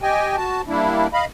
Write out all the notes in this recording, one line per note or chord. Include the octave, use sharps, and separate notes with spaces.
G4 D#5 G5 G#5
F#4 A5
G3 A#3 D4 E4
D#5 F5 B5